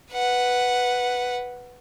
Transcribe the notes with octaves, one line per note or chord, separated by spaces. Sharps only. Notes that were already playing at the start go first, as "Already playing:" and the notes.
B4 F#5